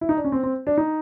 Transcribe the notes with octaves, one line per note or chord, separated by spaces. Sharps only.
E4
D#4
D4
C#4
C4
C4
D4
D#4